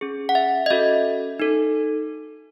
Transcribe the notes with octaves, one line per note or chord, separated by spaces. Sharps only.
C#4 G#4
F#5
E5
D#5
C#4 F#4 A4 E5
D#4 A4